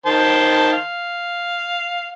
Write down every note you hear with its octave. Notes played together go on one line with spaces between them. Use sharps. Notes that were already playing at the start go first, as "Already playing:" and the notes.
D#3 C5 A5
F5